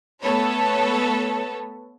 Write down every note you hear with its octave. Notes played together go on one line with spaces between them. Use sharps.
A3 B3 A4 B4 C#5